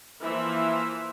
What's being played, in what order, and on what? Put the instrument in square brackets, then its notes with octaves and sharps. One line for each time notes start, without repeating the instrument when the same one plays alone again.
[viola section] E3 F3 A#3 C5 E5